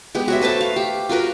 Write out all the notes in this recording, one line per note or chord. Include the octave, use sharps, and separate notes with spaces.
G#3 B3 G4
F#4 C#5 E5
A3 B4 C5 A5
F5
G4
F4 F#4 A#4 B4